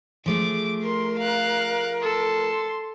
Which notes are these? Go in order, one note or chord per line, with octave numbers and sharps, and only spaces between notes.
F3 A3 G#4 D6
A#4 C6
F5 F#6
A4 C6